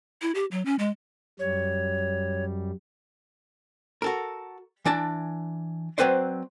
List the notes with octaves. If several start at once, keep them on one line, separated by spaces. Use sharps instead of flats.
E4
G4
F#3
C#4
G#3
F#2 G3 C#5
F#4 A4 A#4
E3 D4 D5 A5
F#3 G3 C4 B4 C5 D5